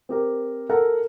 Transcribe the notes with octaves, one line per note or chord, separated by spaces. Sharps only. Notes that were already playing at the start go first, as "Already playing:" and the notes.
C4 G4 A#4
A4 A#4 F#5